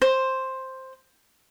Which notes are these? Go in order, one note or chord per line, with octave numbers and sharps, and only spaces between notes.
C5